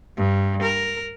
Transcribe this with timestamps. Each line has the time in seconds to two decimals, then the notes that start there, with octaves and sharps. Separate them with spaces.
0.17 G2
0.63 A#4